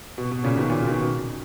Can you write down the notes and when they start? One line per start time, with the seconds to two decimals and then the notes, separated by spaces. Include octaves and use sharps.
0.18 B2
0.31 B2
0.44 A#2 C#3
0.57 B2 D#3
0.70 A#2 C#3
0.87 B2 D#3